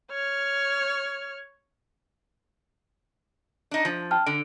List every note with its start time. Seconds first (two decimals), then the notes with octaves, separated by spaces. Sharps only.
0.11 C#5 F6
3.71 D4 D#4
3.85 F3
4.11 G5 A5 F6
4.26 D3 D7